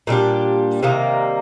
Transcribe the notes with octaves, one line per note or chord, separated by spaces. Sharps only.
A#2 G3 D4 G4
C3 D#3 G3 A#3